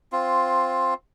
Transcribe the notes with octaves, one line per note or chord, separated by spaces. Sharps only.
C4 F4